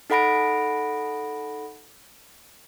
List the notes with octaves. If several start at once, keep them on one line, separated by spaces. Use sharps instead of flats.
D#4 A4 F#5 B5 A#6 D7